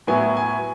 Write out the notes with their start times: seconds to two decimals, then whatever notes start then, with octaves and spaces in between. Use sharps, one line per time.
0.07 A2 F#3 B3 E4 G#5
0.37 G#5